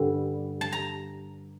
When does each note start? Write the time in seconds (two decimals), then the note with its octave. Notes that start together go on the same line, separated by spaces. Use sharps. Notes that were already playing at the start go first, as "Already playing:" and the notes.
Already playing: G2 D3 G3
0.61 A5
0.72 A#5